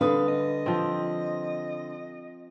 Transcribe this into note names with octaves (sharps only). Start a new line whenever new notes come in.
D3 G3 B4 F5 D#6
D#5
F3 C4